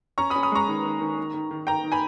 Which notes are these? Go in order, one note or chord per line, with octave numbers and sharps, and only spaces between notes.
C#4 A#5 C#6
B5 D#6
C#4
B5 D#6
G#3 A#5 C#6
D#3
D#3
D#3
D#3
D#3
D#3
D#3 G5 A#5
D#3
G#5 B5